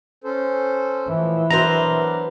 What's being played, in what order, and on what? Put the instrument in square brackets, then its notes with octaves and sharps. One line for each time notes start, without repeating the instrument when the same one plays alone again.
[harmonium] C#4 A4 C5
[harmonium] A2 F3 [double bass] E3
[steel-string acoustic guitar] F#3 B3 C5 [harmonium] D4 A#4 [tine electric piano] A#5